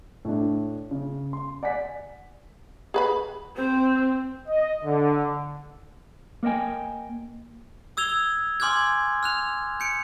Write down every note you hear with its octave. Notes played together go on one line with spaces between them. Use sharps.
A2 D4
C#3
C6
D5 F#5 G#5 B6
G#4 B4 B5
C4 C5
D#5
D3
A#3 A#4 D#5 G5 G#5
D#6 E6 G#6 F7 G7
G#5 C6 D6 F6 G6 G#6
F6 F#6 F7
G6 C#7 D7